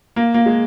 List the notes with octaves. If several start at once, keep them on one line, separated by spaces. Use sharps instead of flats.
A#3
A#3
G#3